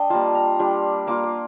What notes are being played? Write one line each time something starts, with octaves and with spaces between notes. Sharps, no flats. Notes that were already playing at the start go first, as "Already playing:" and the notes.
Already playing: D4 D#5 G5
G3 A#3 F4 A5
A#5
G3 D4 F4
A#3 F4 D6
D6